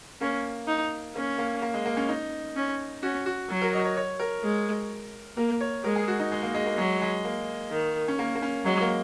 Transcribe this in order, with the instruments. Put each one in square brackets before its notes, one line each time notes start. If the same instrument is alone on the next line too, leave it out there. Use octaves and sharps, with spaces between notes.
[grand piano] A#3 [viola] C#4
[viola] D#4
[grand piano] A#3 [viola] C#4
[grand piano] A#3
A#3
G#3
A#3
C#4
D#4
[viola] C#4
[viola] C#4 [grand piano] F#4
[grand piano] F#4
[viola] F#3
[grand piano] A#4
D#5
C#5
C#5
A#4
[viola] G#3
[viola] A#3 [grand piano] A#4
[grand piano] C#5
[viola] G#3 [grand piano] A#4
[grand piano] G#4
F#4
D#4
G#3
A#3
G#3
A#3
[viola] F#3 [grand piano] G#3
[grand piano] G#3
A#3
[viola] D#3
[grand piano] C#4
A#3
A#3
C#4
[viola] F#3 [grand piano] G#3
[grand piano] A#3